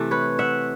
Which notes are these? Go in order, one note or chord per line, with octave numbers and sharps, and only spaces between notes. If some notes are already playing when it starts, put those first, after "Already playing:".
Already playing: C3 E3 A3
B4 C#5
E5 F#5